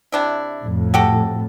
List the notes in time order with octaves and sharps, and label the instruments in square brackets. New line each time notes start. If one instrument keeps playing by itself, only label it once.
[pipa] C3 D4 E4
[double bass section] F2 A2
[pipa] F#4 G4 A4